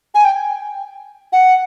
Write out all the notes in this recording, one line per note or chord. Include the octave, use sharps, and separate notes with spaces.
G#5
G5
F#5